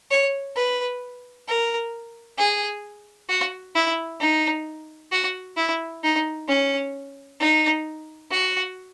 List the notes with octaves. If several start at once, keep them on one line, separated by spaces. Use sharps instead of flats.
C#5
B4
A#4
G#4
F#4
E4
D#4
F#4
E4
D#4
C#4
D#4
F#4